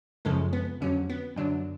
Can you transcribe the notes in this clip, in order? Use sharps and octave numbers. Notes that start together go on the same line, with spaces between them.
F#2 C#3 F3 G#3 A4
B3
F2 D3 F#3 C#4
B3
F#2 D3 F#3 D4